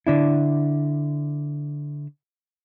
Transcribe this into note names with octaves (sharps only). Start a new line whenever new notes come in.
D3 D4 E4